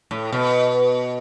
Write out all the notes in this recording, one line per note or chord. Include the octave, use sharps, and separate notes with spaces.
A2
B2